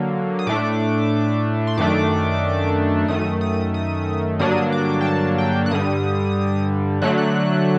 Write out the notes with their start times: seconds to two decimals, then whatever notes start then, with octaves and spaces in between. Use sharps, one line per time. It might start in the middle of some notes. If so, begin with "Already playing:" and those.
Already playing: D3 F#3 A#3
0.39 D#6
0.47 A2 A3 D4 D6
1.67 C6
1.77 F#2 D#3 A3 D4 D6
3.08 F#2 D#3 A3 D#6
3.41 D#6
3.74 D#6
4.39 G2 D3 F#3 A#3 D4 D#6
4.72 D6
5.01 G5
5.06 A5
5.38 G5
5.66 F#6
5.71 G2 D3 G3 D#6
7.02 D3 F#3 A3 D4 F#6
7.18 F#6